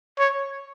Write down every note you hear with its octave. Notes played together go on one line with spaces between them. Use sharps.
C#5